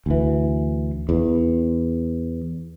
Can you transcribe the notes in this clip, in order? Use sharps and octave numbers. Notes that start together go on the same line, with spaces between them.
D2 E3
E2